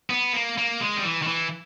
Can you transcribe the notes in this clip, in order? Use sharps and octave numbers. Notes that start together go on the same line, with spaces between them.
B3
A#3
A#3
G#3
G3
E3
D#3
E3